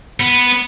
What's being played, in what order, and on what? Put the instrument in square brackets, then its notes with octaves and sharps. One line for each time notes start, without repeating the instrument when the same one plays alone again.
[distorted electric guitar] B3